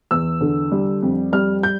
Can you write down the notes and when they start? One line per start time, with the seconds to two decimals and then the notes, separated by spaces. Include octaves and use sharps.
0.11 E2 E6
0.41 D3
0.72 G3
1.02 F2
1.32 G3 F6
1.63 G6